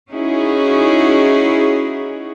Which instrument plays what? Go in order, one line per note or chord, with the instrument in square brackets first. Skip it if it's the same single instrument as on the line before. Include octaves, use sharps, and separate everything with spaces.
[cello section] C#4 D#4 E4 F#4 G#4